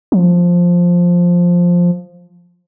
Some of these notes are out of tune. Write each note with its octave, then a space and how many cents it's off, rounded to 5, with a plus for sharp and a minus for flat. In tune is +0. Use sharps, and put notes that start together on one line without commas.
F3 +5